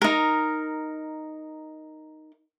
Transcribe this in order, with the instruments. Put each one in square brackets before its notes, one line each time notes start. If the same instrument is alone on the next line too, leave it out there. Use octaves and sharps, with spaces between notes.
[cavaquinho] D#4 A#4